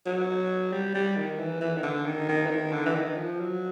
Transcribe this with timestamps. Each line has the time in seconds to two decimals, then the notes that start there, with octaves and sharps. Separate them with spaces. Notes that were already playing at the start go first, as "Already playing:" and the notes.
0.06 F#3
0.73 G3
0.95 G3
1.17 D#3
1.39 E3
1.61 E3
1.77 D#3
1.83 D3
2.06 D#3
2.29 D#3
2.46 E3
2.50 D#3
2.73 D3
2.86 E3
2.95 D#3
3.17 F3
3.40 F#3